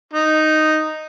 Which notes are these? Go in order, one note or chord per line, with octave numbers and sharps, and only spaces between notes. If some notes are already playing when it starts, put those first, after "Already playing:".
D#4